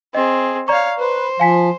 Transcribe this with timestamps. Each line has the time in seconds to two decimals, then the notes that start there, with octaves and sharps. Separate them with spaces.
0.15 C4 G#4 D#5
0.68 C#5 D5 F5 A#5 C#6
0.99 B4 C5
1.40 F3 F5 G#5 B6